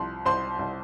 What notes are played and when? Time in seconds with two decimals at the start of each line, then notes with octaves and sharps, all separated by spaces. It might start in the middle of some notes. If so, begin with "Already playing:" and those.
Already playing: C2 F3 C6
0.25 C2 C5 C6
0.59 C2